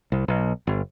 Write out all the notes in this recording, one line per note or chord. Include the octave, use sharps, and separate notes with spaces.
C2
B1
G1